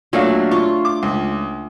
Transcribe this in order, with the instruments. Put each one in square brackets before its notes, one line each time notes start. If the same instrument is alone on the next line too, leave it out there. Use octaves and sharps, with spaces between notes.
[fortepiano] A#2 F5 [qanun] F#3 A3 D4
[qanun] F4 [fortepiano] C#6
[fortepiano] D6
C#2